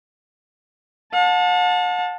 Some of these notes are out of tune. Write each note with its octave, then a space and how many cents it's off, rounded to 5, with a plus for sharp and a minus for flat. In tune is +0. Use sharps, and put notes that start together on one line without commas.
F#5 -45 A5 +0